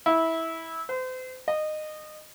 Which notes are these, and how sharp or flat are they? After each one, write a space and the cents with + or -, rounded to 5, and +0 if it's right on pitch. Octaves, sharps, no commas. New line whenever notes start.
E4 -15
C5 -35
D#5 -20